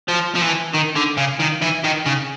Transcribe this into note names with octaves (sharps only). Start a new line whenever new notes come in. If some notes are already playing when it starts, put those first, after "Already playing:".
F3
F3
E3
D#3
D3
C#3
D#3
E3
D#3
C#3